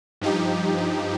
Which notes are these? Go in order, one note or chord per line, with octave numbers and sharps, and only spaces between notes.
G2 F3 D#4 G4